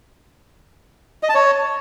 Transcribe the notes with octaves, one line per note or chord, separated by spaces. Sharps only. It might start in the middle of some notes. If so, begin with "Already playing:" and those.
D#5
A5
C#5